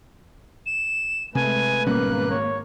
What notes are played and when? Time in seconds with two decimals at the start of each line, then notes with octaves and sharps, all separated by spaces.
0.66 E7
1.35 C3 G#3 A3 B4 G#5
1.86 G#1 B2 G3 A#3 C#4 F#6
2.31 C#5